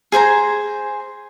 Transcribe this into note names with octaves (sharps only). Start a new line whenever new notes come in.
G#4 C5 G#5 A#5